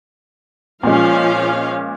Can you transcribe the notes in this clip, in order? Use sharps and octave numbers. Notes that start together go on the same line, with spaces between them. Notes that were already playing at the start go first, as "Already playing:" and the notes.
A#2 F3 G#3 C#4 F5